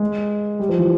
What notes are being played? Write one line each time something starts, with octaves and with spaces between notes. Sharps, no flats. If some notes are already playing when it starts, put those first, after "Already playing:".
Already playing: G#3
G3
F3
E3